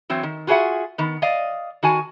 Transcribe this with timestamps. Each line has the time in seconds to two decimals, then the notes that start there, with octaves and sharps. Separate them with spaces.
0.10 E3 F#3 C4
0.23 D#3
0.47 F4 F#4 G#4 A4 E5 F#5
0.98 D#3 B3
1.22 D5 D#5 F5
1.83 D#3 F#4 G#5 A5